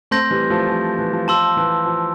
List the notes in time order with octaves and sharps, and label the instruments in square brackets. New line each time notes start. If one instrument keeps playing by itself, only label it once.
[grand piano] A3 C4 [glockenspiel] C6 G6 A#6
[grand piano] E3 G3
F3 A3
F3
E3
F3
[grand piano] F3 [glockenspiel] A5 C6 E6
[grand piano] E3
F3